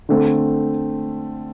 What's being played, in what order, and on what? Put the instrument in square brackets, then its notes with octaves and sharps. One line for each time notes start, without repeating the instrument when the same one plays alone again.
[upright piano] D3 A3 C4